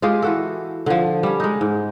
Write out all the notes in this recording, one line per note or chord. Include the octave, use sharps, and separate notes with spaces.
G#3 F4 G4 G#4
E3 F#4 A4
D3 F3
G3 C#4
G#3 D#4
G#2